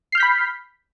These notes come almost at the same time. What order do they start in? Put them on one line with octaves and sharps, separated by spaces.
C7 F6 G6 B6 B5